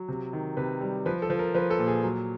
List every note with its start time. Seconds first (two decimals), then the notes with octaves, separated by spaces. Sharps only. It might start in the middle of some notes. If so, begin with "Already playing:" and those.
Already playing: F#3
0.08 C3
0.33 D#3
0.57 C3 B4
0.81 G3
1.06 F3 B4
1.22 A4
1.30 F3
1.39 A#4
1.54 F3 B4
1.70 A4
1.79 A#2
1.87 G#4
2.03 F#3